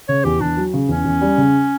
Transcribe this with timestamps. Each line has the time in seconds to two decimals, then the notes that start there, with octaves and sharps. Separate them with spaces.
0.08 C#3 C#5
0.24 E2 G4
0.41 E2 D4
0.57 F#3
0.74 C#3
0.89 E2 C#4
1.05 E2
1.21 G3
1.38 C#3